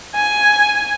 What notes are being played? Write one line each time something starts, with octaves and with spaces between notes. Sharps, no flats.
G#5